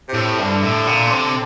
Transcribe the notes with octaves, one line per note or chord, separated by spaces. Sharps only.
C3
A2
C3
G2
D3
A2
A#2
C3